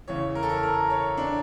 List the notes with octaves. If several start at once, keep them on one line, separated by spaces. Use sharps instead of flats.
E2 C#3 E3 C#5
A#4
A4
A#4
A#4
C#5
D4